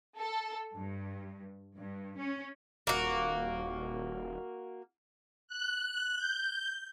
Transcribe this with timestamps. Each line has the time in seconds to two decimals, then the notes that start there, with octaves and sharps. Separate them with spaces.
0.18 A4
0.75 G2
1.77 G2
2.18 C#4
2.87 D#1 A#3 F#4
5.48 F#6
6.16 G6